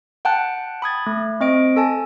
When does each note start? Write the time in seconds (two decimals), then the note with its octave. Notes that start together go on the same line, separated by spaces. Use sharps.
0.25 F#5 G5 A5 F#6
0.82 B5 D#6 G#6 A6
1.06 A3
1.41 C4 D#5 D7
1.76 A4 G#5 A5